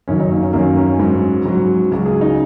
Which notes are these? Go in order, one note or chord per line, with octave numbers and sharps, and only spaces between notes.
F#2 D#3 F#3 C#4
D#4
A#3
C#4
F#2 D#3 F#3 A#3
C#4
G#2 F#3
G#2 F#3
C#2 C#3 F#3
G#4
D#4